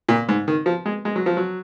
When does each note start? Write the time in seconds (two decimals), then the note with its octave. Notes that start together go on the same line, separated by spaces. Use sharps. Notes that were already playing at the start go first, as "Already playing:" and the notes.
0.09 A#2
0.29 G#2
0.48 D#3
0.66 F3
0.86 G#3
1.05 G#3
1.16 F#3
1.26 F3
1.37 F#3